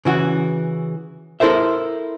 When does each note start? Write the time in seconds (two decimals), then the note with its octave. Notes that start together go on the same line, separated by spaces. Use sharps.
0.05 C#3 E3 F#4
1.40 E4 A4 A#4 C5 E5